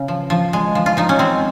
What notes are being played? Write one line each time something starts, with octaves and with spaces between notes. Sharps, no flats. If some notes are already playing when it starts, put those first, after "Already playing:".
Already playing: C#3
F3
F3
G#3
F3
F4
F3 D#4
C#4
G#3 C4